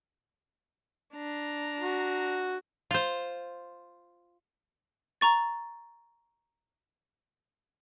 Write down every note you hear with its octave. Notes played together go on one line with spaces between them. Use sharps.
D4 A#5
F#4
F4 C5
A#5 C#6 A6